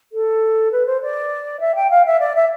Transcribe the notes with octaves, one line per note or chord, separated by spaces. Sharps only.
A4
B4
C5
D5
E5
G5
F5
E5
D5
E5